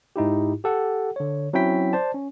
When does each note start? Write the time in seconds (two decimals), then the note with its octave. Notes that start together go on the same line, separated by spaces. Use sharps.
0.16 G#2 D#4 E4 G4
0.64 G4 A4 F#5
1.16 D3 C#5
1.53 F#3 C4 C#4 E4 G5 B6
1.93 C5 D5 A5
2.14 C#4